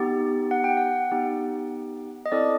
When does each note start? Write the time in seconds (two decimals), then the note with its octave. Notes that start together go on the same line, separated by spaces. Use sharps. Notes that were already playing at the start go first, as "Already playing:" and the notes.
Already playing: B3 D#4 G4
0.51 F#5
0.64 G5
0.77 F#5
1.11 B3 D#4 G4
2.26 D#5
2.32 C4 E4 A4 D5